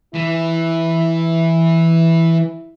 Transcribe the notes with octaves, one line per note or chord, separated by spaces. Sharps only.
E3 E4